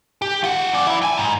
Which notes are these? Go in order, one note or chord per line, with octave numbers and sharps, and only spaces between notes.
G4
F4 F#5
F#2 D5
E3 E4
G5 G#5
G#2